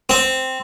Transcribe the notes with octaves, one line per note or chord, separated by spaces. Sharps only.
C4